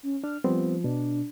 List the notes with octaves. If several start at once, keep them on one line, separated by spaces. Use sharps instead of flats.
C#4
D4 F6
F3 G3 B3 C4
B2 D4